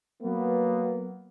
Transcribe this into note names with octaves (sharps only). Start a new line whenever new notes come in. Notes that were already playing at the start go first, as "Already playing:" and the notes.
F#3 A#3 B3